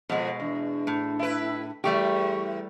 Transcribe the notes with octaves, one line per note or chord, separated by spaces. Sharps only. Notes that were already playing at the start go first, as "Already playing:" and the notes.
F2 B2 G#3 F#5
E2 D4
A2
E4 B4
E2 G3 A3 G4 C#6